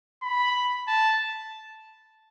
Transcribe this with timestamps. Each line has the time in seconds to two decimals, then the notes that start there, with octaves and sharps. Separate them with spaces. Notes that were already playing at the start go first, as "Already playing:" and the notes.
0.23 B5
0.88 A5